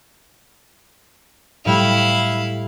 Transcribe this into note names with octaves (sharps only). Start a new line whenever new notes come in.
A2 G3 A3 E4 F5